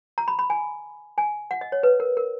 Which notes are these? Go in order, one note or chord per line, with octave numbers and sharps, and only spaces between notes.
A#5
B5
B5
G#5
G#5
F#5
D#5
C#5
B4
A#4
A#4